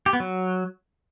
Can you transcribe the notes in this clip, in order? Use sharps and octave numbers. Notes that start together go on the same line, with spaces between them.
G4
B3
F#3